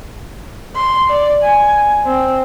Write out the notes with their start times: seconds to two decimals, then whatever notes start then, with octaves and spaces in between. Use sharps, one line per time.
0.76 C6
1.10 D5
1.43 G#5
2.05 C4